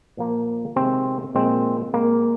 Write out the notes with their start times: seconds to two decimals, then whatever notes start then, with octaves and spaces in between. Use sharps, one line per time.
0.17 A#2 F3 A#3
0.76 C3 D#3 G#3 C4
1.35 A#2 F3 G#3 C4
1.94 A#2 G#3 A#3